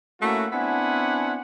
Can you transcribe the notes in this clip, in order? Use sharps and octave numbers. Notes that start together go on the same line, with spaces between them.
A3 A#3 C#4 E4 F#4
B3 C4 D4 E4 F#5 G#5